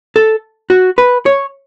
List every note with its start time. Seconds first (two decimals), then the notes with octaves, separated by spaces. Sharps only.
0.16 A4
0.70 F#4
0.98 B4
1.26 C#5